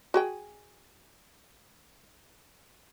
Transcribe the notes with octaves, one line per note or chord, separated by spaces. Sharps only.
F#4 G#4 G5